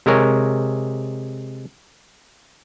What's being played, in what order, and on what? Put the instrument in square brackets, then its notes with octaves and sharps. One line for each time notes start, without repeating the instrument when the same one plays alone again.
[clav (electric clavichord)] C3 G#3 A#4 C#5